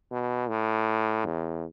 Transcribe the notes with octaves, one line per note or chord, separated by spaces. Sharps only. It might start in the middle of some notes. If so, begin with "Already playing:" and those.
B2
A2
E2